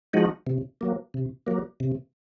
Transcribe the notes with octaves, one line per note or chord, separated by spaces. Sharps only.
F3 G#3 D#4 F#4
C3
F#3 A#3
C3
F#3 A#3
C3